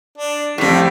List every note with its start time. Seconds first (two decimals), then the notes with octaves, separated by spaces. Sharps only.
0.18 D4
0.58 F2 A2 G3